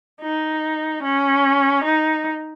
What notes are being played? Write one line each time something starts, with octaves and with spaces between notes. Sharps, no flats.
D#4
C#4
D#4